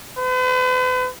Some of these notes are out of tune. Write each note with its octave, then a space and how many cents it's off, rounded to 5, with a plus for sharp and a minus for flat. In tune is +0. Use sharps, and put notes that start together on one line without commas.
B4 +45